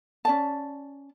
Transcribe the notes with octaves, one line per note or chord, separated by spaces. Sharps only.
C#4 D5 A5